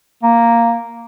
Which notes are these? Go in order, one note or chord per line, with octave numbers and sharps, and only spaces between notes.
A#3